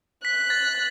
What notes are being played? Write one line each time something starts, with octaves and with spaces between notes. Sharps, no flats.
F#6 B6
A6